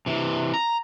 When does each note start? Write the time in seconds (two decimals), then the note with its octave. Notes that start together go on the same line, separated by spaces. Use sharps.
0.06 C3 E3
0.54 A#5